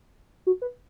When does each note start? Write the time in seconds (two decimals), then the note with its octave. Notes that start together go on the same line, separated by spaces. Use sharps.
0.47 F#4
0.62 B4